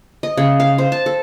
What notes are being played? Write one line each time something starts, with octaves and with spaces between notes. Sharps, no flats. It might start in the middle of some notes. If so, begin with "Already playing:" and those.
D#5
C#3
F5
C5
A5
A4